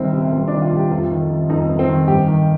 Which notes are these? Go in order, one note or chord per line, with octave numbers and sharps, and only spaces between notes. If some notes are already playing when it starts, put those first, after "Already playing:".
Already playing: C2 D#3 C4
C3
C2 C4
D#3 D4
F4
C2
G4
F2 F4
D#3
D#3
F2 D#4
F2
C4
D#3
G2 G4
D#3